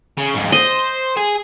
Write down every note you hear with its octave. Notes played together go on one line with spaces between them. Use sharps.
C#3
F2 G#2
C5 D#5
G#4